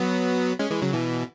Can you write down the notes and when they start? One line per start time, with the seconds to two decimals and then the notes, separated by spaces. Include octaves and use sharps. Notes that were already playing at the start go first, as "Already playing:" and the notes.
Already playing: F#3 B3
0.59 G#3 C#4
0.70 E3 G#3
0.82 C#3 F#3
0.93 B2 E3